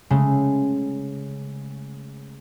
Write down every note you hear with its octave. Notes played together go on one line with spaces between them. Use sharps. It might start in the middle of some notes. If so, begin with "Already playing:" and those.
C#3 G#3 A3